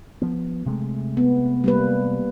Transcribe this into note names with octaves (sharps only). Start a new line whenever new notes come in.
F3 B3
C3 G#3 A3
B3
G3 A#3 B4